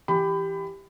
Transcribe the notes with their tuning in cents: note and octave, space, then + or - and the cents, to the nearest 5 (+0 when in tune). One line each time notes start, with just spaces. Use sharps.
E3 +10 G4 +0 B5 +25